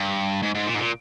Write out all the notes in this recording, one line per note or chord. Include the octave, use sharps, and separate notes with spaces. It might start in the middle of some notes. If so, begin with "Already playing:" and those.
Already playing: G2
G#2
G#2
A#2
G#2
A#2